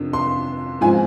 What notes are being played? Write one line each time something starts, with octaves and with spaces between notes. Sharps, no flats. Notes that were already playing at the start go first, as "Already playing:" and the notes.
Already playing: F2 C3 D#3 D4
C6
G#2 F3 C4 G#5